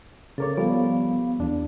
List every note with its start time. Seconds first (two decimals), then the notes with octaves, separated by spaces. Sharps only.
0.38 C#3 A4 A#4 C#5 D6
0.57 F3 G3 B3 F5
1.40 E2 D4